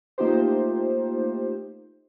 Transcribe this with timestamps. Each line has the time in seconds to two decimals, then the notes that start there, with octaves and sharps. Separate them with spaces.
0.18 A3 A#3 D#4 F4 G4 C5